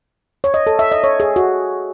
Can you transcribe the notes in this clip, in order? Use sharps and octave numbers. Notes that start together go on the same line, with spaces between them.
C#5
D#5
A4
E5
D#5
C#5
G#4
F#4